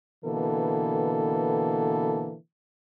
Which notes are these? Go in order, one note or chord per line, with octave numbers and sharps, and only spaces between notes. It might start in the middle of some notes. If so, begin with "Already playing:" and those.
B2 D3 E3 A#3 A4